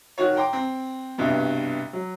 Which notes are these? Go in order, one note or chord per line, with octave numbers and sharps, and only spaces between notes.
D#3 F#4 C#5
G5 A#5 C6 D6
C4
C2 G2 B2
F#3